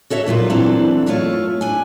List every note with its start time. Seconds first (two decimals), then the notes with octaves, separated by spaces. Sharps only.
0.10 F#4 A4 C#5 E5
0.26 F2 A#2 F#3 F4
0.50 E3 F#3 C4 D4 A4
1.06 F#2 A3 F4 A4 C#5
1.61 D4 G#5